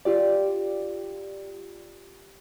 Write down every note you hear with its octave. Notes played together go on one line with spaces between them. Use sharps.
F4 G4 D5